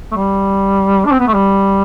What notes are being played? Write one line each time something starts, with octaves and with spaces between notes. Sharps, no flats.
A3
G3
D4
C4
B3
A3
G3